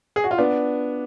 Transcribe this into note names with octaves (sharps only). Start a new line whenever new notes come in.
G#4
F#4
F4
B3 D4